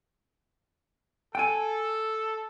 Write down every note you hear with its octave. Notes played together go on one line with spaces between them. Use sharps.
A4 G5 G#5